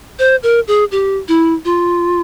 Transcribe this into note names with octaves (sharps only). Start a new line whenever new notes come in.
C5
A#4
G#4
G4
E4
F4